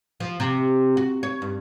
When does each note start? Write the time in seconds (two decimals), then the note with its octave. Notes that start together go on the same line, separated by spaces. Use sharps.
0.20 F3
0.40 C3
0.97 F#4
1.23 C#5
1.42 G2